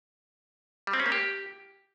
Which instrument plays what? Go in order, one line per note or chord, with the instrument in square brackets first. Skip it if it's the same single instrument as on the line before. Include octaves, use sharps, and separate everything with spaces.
[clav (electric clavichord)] G3
C4
C#4
A#3
G4